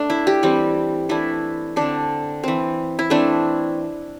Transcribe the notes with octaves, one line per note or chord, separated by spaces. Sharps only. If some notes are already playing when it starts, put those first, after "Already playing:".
Already playing: A3 D4
E4
G4
E3 G3 C4
E3 A3 D4 E4
D3 C4 D4
E3 C4
E4
E3 A3 C4 D4